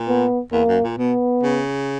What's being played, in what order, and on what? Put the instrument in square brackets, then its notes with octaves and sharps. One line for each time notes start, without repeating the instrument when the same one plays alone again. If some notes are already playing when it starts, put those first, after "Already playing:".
Already playing: [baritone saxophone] A#2
[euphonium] B3
[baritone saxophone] E2 [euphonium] A#3
[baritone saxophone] F#2
A#2
[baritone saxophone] B2 [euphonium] B3
[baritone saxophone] C#3